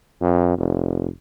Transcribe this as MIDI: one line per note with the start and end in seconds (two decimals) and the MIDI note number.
0.22 0.57 41
0.58 1.08 29